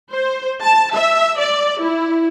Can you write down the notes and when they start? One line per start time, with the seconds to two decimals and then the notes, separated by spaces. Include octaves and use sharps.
0.12 C5
0.62 A5
0.94 E5
1.39 D5
1.81 E4